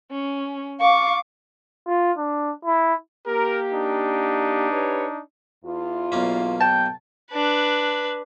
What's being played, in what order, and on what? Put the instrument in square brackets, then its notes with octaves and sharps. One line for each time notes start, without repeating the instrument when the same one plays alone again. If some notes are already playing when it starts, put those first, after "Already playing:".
[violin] C#4
[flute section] F5 [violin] C#6 D6
[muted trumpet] F4
D4
E4
[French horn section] A#3 G4 [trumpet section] A#4
[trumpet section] D4 D#4
[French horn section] G4 B4 C#5
E2 F4
[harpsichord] B1 A#3 C#4
[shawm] G5 [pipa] A5
[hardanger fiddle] D4 B4